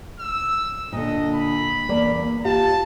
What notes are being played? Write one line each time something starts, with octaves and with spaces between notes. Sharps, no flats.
E6
A#2 D3 D#5
B5
E2 A#3 D5
F4 G4 F5 A5